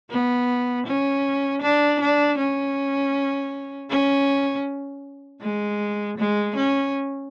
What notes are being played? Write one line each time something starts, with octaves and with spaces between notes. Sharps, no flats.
B3
C#4
D4
D4
C#4
C#4
G#3
G#3
C#4